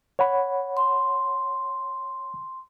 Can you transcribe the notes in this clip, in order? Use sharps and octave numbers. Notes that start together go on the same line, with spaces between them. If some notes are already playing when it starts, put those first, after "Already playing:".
C#5 F#5 B5
C6